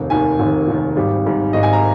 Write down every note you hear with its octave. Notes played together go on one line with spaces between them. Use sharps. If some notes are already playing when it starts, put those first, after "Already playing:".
Already playing: F1 D#2
F1 D#2 D#3 G#5
F1 D#2 D#3
F1 D#2 D#3
G#1 G#2 G3
G#1 G#2 G3
G#1 G#2 G3 D#5
G#5
A#5